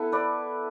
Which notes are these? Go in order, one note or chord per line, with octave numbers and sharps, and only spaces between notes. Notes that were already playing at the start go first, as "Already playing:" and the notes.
Already playing: B3 E4 A4
B4 D5